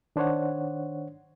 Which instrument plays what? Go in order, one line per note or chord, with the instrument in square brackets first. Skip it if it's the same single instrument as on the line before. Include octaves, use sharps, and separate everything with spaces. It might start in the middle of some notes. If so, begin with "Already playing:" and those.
[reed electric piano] D#3 D4 C5 C#5 F#5